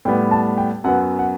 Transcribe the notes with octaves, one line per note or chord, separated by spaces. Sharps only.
A2 G3 B3 G5
A5
G5
F#2 F#3 B3 F#5
F#5